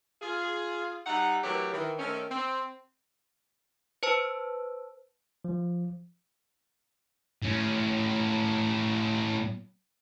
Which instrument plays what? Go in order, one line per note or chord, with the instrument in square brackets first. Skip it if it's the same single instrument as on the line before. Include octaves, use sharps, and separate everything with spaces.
[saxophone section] F4 G#4
G3 D#4 E5 F#5
E3 F#3 A3 G4 A#4 C#5
D#3 E3
D#3 A3 C4 C#4
C4
[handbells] B4 C5 A5 E6
[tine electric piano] F3
[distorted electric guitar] A2 C#4